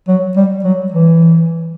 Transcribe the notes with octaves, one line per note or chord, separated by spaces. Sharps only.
F#3
G3
F#3
E3